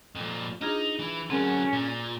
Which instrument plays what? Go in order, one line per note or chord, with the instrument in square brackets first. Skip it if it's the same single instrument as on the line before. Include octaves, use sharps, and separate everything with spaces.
[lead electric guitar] F2 A#2
[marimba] D4 F4 G#4 [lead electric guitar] D#4
[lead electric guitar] E3
[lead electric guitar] D3 F#3 [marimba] C4 G#4 A#4 [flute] C#4
[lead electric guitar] A#2